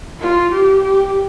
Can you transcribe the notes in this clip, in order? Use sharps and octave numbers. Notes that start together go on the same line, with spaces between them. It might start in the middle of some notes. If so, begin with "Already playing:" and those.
F4
G4
G4